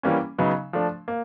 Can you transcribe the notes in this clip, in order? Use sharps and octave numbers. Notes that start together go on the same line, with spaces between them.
E3 G3 A#3 C#4
C#3 F#3 B3 D#4
F3 A3 D4
A#3